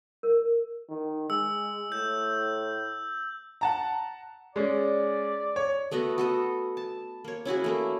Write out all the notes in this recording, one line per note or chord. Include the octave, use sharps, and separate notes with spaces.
A#4
D#3
G#3 E6
A2 G6
F#5 A5 A#5
G#3 C#4 D5
C#5
A3 B3 F#4 D#5
F#4 A4 D#5
A5
A#3 C#5
C#4 E4 F#4 G#4
A3 A#3 E4